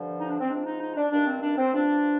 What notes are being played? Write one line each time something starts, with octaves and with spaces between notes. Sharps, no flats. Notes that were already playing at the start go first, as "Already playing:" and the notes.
Already playing: G2 D3 F3
D#4
D4
C4
G#2 F3 D4
D#4
D#4
D4
G2 D#3 D4
C4
D4
C4
G2 F3 D4